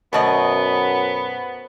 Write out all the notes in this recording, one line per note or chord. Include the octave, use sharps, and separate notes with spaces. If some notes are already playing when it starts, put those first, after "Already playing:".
F#2 B2 A3 B3 C5 D#5 F#5